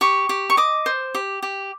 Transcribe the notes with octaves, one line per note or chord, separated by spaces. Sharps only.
G4 C#6
G4
C#6
D#5 D6
C5
G4
G4